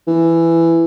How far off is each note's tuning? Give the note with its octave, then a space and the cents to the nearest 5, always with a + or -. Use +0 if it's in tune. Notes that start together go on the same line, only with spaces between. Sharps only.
E3 +10